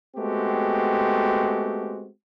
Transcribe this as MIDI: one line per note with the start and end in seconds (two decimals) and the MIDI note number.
0.17 2.09 56
0.17 2.09 57
0.17 2.09 59
0.17 2.09 60
0.17 2.09 66
0.17 2.09 67